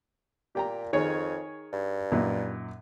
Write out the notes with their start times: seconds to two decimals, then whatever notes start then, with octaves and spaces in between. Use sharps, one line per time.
0.55 A#2 G4 G5 A#5
0.93 F2 D#3 G#4 C#5
1.73 G2
2.12 F#2 A#2 D#4